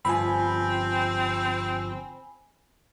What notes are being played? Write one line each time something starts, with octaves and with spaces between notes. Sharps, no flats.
G1 F3 C4 G#5 B5